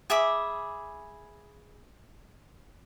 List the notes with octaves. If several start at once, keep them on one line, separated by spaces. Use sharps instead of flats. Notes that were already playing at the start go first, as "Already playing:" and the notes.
G#4 E5 B5 D6